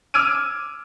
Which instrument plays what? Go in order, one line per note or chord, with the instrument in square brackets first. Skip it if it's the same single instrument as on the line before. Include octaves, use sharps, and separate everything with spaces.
[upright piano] D6 E6 F6 G#6 D7 D#7